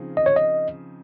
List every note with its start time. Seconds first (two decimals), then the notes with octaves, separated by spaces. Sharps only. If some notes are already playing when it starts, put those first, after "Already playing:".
Already playing: C#3 F3 C4 D#4 G#4
0.17 D#5
0.26 C#5
0.36 D#5